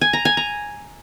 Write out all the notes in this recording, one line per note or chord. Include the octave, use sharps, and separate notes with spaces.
G#5
A#5
G#5
A#5